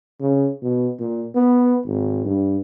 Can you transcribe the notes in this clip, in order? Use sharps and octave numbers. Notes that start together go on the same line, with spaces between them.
C#3
B2
A#2
B3
G#1
G2